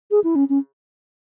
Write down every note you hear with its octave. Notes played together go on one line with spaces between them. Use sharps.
G#4
E4
C#4
C#4